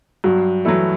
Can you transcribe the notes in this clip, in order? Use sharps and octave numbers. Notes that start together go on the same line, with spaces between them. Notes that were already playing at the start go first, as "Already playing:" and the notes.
G2 F#3 F#4
E3 F#3 A3 E4